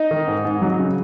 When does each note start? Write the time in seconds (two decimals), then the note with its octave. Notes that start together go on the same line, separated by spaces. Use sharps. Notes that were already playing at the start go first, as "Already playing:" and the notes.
Already playing: D#4
0.11 D#3
0.27 G#2
0.45 G#2
0.62 F#3
0.79 C#3